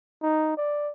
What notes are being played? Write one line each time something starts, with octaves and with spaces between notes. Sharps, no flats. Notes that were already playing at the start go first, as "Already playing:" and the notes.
D#4
D5